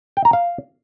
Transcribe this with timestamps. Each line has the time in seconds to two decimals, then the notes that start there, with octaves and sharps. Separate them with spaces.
0.17 G5
0.25 A#5
0.33 F5